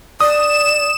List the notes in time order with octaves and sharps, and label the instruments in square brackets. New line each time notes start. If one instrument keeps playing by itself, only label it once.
[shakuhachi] D5 [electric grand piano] D#6 [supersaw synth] E7